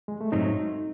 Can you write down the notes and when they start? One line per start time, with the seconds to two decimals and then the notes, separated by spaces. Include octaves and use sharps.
0.08 G#3
0.21 A3
0.32 G#2 F#3 A3 C4 D#4